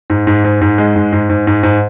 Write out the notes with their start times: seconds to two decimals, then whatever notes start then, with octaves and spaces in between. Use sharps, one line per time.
0.10 G#2
0.27 G#2
0.44 G#2
0.61 G#2
0.78 G#3
0.96 G#2
1.13 G#2
1.29 G#2
1.47 G#2
1.63 G#2